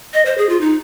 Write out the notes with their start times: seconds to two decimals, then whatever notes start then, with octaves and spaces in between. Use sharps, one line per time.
0.14 D#5
0.26 C5
0.38 G#4
0.49 F4
0.61 D#4